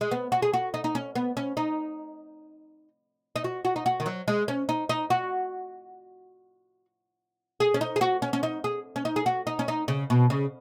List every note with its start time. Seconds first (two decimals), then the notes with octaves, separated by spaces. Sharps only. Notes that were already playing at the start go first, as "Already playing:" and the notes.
0.01 G#3
0.11 B3
0.32 F#4
0.42 G#4
0.53 F#4
0.74 D#4
0.84 D#4
0.95 C#4
1.15 B3
1.37 C#4
1.57 D#4
3.36 D#4
3.44 F#4
3.65 F#4
3.76 D#4
3.86 F#4
4.00 D#3
4.06 F#3
4.28 G#3
4.48 C#4
4.69 D#4
4.89 D#4
5.10 F#4
7.60 G#4
7.74 C#4
7.81 D#4
7.96 G#4
8.01 F#4
8.22 C#4
8.33 C#4
8.43 D#4
8.64 G#4
8.96 C#4
9.05 D#4
9.16 G#4
9.26 F#4
9.47 D#4
9.59 C#4
9.68 D#4
9.88 C#3
10.10 B2
10.30 C#3